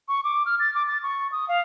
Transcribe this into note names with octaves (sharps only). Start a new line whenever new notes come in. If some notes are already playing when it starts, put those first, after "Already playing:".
C#6
D6
F6
A6
D6
A6
C#6
D#6
F5